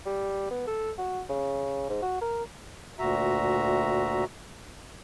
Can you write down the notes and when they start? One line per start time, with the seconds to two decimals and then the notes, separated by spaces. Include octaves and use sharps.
0.06 G3
0.50 B3
0.67 A4
0.98 F#4
1.29 C#3
1.89 G#2
2.02 F#4
2.21 A#4
2.99 D2 A#2 F#4 E5 A#5